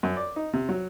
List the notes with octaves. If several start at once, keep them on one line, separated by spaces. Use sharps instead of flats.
F#2
D5
D#4
C3
F#3